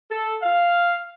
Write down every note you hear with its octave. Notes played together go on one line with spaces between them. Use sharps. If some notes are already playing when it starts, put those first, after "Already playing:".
A4
F5